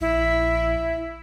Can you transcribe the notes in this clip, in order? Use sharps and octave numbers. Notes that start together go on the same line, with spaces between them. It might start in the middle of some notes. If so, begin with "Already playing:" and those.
A#1 E4